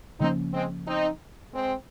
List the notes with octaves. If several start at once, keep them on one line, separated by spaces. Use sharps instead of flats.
C#3 F3 A#3 C4 C#4 D#4
G#3 C4
C4 D#4
G#3 C4